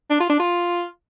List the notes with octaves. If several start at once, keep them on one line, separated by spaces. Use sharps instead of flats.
D4
F4
D4
F4